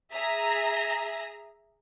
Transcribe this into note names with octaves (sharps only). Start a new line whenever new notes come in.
G#4 E5 A#5